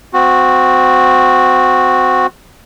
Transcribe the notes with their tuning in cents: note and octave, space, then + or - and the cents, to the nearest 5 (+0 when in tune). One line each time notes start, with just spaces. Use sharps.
C4 -25 F#4 -15